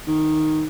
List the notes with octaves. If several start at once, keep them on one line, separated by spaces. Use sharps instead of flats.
D#3